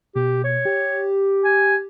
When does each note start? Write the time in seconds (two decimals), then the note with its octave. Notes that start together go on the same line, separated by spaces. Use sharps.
0.15 B2 G4
0.44 C#5
0.65 G4
1.44 G#5